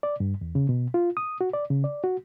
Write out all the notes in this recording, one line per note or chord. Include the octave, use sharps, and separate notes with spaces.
D5
G2
E2
C#3
B2
F4
D#6
F#4
D5
C#3
D5
F#4